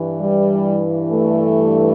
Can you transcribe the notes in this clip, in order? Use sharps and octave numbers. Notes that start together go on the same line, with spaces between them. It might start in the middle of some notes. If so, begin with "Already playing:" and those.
Already playing: G2 E3
G3
A3